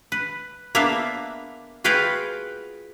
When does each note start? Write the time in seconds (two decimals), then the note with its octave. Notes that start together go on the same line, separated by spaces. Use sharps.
0.12 B4
0.75 A#3 B3 D4 E5 F5
1.84 F4 F#4 G#4 B4 F5 G5